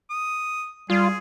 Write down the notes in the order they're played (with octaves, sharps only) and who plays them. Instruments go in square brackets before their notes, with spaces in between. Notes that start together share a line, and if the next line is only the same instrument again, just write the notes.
[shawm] D#6
[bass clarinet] G3 [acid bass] F4 [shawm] G#4